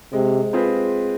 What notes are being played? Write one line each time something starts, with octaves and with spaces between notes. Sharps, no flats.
C3 G#3
C4 F4 G#4 B4